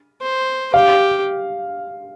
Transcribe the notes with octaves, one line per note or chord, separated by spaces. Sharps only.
C5
G4 F5